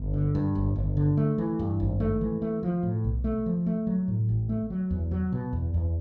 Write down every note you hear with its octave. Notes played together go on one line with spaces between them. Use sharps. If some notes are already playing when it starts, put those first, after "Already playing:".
Already playing: G1
D3
G2
G1
G1
D3
A3
E3
G2
G#1
A3
E3
A3
F3
A2
B1
A3
F3
A3
F#3
A2
A1
A3
F#3
E2
F#3
B2
E2
E2